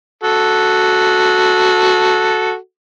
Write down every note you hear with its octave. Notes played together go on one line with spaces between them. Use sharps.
F#4 A4